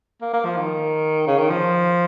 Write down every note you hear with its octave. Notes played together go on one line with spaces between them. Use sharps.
A#3
A#3
F3
D#3
C#3
D#3
F3